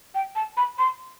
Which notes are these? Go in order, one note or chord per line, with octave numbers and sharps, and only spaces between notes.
G5
A5
B5
C6